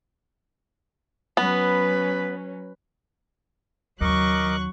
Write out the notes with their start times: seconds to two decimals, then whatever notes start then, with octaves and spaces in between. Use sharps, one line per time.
1.37 F#3 B3 C#4 B4
4.01 D#2 C#3 F#3 A#4 D#5 C#6 D6 F#6